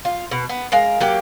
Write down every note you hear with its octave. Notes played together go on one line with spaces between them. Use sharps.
F4
B2
B3
G#3 A#4 F5
F#3 A#3 G4